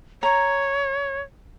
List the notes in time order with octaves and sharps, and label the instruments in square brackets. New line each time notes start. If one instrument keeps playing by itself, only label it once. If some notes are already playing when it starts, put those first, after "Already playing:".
[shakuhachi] C#5 [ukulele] A#5